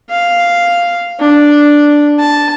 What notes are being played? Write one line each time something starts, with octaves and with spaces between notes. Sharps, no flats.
F5
D4
A5